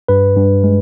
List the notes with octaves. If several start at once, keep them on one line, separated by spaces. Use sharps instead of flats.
G2 B4
G2
G#3